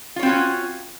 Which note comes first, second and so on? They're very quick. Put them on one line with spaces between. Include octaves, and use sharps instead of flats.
F4 C#5 C4 F#4 C#4